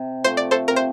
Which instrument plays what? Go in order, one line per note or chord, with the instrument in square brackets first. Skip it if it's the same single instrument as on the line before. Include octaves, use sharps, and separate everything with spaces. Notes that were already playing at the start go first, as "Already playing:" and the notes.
Already playing: [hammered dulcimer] C3
[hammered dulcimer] F3 A3 [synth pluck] C5
[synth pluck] D5
A4 C5
[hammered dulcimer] C3 [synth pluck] A#4
[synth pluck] C5